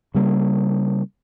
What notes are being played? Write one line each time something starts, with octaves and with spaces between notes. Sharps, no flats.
C#3 G3 A#3